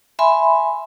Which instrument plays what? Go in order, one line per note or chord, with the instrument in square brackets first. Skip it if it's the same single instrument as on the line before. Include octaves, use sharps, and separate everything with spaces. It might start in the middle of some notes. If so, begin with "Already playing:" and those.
[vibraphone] E5 G#5 B5 C6